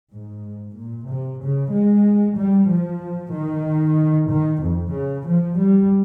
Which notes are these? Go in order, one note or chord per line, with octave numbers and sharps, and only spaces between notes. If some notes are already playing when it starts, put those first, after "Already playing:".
G#2
A#2
C3
C#3
G#3
G3
F3
D#3
D#3
F2
C#3
F3
G3